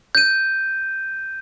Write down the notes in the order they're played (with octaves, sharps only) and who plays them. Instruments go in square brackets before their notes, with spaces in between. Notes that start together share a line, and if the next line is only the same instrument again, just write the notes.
[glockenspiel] G6 D#7